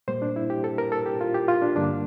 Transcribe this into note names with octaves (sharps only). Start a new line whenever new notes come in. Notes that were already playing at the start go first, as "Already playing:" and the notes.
A#2 G3 A#3 C5
D4
E4
G4
A4
A#4
A4
G4
F4
G4
F4
D4
G2 D3 G3 A#3 D4